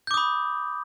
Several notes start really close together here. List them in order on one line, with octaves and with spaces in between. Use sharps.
G6 D6 D#6 B5